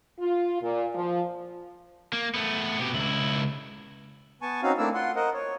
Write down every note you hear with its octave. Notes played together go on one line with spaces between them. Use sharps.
F4
A#2
F3
A#3
A3 B3
B2 G4
C#2 E4
B3 G#5 A5 C#6
C4 C#4 D#4 F#4 F5
A3 A#3 C4 D4 E4 E6
F4 F#5 C6
A#4 C5 D#5 F#5
C#5